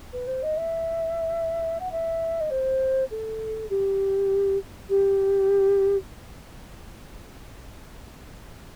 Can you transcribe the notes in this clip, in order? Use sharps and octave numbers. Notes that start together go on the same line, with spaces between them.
B4
C5
D#5
E5
F#5
E5
D#5
C5
A4
G4
G4